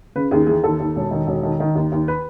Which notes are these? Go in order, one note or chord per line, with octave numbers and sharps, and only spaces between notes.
C#3 B4
D#2 G#4
E3 G#4
D#2 A4
D#2
E1
D#3
E1
D#3
D#3
D#2
D#2
B4